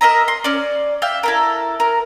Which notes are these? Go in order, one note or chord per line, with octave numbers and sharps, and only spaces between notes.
A#4 D#5 E5 A#5
C6
C#4 D5
E5 F5 G5
E4 A4 A#4
A#4